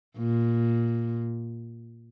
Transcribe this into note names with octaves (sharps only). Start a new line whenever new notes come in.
A#2